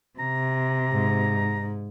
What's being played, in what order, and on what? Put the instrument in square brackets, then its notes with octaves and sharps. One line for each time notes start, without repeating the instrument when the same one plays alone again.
[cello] C3 [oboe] A#5
[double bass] G#2